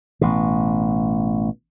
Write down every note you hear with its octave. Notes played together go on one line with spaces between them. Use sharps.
A1 B2